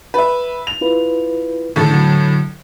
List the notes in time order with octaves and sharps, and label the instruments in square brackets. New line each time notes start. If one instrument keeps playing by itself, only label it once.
[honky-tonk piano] B4 E5
F7
[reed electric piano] E4 F4 B4
[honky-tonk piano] A2 A4 [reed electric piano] D3 D#3
[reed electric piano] D3 F#3